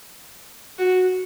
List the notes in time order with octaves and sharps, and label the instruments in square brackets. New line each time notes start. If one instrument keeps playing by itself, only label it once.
[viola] F#4